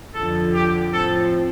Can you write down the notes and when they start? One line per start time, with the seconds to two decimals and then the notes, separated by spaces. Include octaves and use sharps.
0.14 F2 D3 F3 A4
0.54 G4
0.93 A2 F3 C4 A4